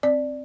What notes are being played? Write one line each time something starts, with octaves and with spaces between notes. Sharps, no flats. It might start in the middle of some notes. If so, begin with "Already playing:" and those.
C4 D5